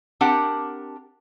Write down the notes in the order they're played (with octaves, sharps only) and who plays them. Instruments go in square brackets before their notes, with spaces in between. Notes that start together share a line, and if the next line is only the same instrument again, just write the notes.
[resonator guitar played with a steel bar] C4 D4 G4 A#4 F#5